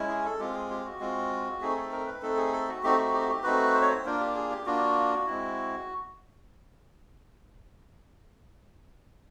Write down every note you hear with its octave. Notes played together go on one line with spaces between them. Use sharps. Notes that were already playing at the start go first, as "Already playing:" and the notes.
Already playing: G#3 C#4 E4
G#4
A4
G#3 C4 F4 G4
G#4
G4
F#4
G#3 C4 F4
A3 C4 D#4 G#4
A4
A#4
B4
A3 C4 D#4 A4
G#4
A4
F#4
A3 C4 D#4 F#4 G4
F#4
G4
F#4
G4
A3 C4 D#4 F#4 B4
C5
C#5
C5
A#3 D4 F4 A#4
G4
G#4
G4
A#3 D4 F4 F#4
G#3 C4 E4